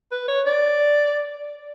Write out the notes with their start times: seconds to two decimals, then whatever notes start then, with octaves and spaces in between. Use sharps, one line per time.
0.11 B4
0.28 C#5
0.46 D5